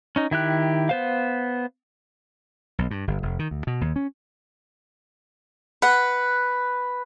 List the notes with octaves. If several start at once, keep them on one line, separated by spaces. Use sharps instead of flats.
C#4 D#4
D#3 E4 G4 F#6
B3 C5 F5
B1
G2
G1
F1
D#3
D2
B2
D#2
C#4
B4 F#5